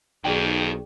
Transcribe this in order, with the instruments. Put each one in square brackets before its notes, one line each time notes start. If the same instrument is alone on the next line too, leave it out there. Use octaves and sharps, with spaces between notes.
[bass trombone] B1 [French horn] F2 [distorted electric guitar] D#3 [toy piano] G#4 D5 G5